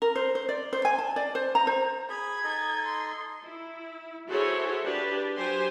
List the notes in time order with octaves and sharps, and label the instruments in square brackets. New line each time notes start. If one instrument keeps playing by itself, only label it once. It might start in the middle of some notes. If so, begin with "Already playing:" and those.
[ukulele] A#4
C5
C5
D5
C5
G#5
A5
D5
C5
A#5
C5
[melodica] G#4 B5 [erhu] G#6
[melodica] D#4 A4 D#5
[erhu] C6
[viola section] E4
E4 F#4 G#4 A4 C5 C#5
D4 G4 B4 A5
F#3 G4 C5 G5 G#5 C6